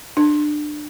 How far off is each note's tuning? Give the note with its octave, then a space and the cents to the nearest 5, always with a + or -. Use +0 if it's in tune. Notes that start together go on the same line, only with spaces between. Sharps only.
D4 +25